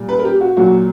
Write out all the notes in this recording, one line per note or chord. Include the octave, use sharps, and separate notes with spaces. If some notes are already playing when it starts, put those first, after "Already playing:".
Already playing: A#2 G3
B4
A#4
G4
F#4
A#2 F#3 F#4